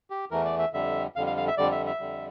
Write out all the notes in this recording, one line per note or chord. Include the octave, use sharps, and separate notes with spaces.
G4
E2 E3 A3 A#4
D5
E5
F2 D3 G3 E5
F2 D3 G3 F5
F5
F5
E5
F2 D3 G3 D5
E5
E5
F2 D3 G3